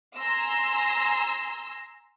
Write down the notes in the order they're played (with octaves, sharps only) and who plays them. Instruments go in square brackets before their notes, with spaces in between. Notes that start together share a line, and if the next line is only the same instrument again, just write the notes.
[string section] G#5 A#5 C6 E6